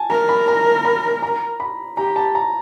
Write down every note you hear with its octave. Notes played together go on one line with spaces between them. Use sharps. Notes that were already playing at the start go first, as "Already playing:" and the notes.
Already playing: G#5 A5
A#4 A#5
B5
A#5
B5
A#5
B5
G4 A#5
A5
A#5